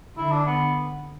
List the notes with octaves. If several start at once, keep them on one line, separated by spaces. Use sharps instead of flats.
D3 E4
D4
B3